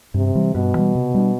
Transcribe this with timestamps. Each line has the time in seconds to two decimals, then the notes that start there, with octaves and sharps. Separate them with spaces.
0.14 G2 C3
0.35 E3 G3
0.55 G2 B2
0.75 E3 G3
0.95 C3
1.14 G3 D4